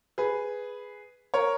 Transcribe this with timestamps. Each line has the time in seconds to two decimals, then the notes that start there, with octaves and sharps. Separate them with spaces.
0.18 G#4 B4
1.34 A#4 C#5